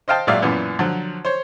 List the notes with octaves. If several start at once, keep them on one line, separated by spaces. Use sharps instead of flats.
C5 D#5 F5 G5 A5
G#1 A#2 F#3 D5 E5 F5
F#2 A#2 E3 B3
D3 F3 F#3
C5 C#5